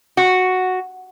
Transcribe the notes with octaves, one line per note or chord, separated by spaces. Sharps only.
F#4